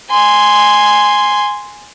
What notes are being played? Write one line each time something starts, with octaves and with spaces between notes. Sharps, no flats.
G#5 C6